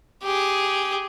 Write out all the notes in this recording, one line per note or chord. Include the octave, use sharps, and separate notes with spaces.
G4 G#4